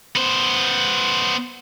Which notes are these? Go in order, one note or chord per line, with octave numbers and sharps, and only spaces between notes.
B3 C5